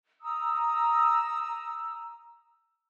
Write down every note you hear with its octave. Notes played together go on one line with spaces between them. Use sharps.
A#5 D#6 E6